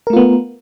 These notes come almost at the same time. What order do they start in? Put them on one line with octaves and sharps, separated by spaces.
A#4 A3 F4 B3